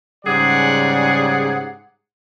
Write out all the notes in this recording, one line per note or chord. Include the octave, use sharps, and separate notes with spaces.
G#2 C#3 G3 G#4 D5 F#5